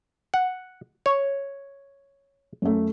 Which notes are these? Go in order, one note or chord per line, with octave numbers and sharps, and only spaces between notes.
F#5
C#5
F#2 A3